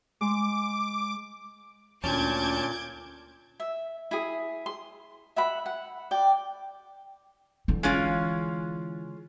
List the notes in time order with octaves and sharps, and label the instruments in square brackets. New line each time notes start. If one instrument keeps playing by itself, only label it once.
[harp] G#3 [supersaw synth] D6
[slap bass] D2 [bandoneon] A#2 [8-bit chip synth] C#4 A5 [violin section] D6 G6 G#6
[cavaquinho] E5
E4 G#4
C6
E5 F#5 B5
F#5
D5 G5
[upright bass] D3 E3
[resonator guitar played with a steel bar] G#3 C#4 F4